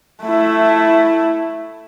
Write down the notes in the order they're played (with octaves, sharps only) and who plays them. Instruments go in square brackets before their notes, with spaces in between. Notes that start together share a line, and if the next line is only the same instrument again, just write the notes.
[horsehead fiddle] A3 E4